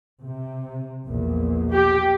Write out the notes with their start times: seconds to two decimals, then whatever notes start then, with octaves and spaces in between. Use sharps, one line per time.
0.22 C3
1.04 A#1 E2 A#2
1.73 G4